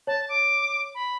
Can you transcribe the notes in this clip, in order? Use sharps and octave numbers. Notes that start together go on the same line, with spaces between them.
C#5 A5
D6
B5